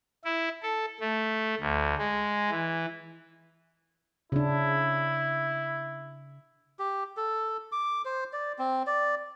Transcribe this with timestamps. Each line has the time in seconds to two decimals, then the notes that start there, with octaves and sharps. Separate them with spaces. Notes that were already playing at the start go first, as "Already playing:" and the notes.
0.24 E4
0.63 A4
1.00 A3
1.60 D2
1.98 G#3
2.50 E3
4.32 C#3 D4 E4
6.79 G4
7.17 A4
7.72 D6
8.05 C5
8.33 D5
8.59 C4
8.87 D5